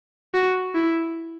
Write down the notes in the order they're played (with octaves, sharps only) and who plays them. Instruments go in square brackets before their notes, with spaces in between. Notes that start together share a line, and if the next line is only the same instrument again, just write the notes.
[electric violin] F#4
E4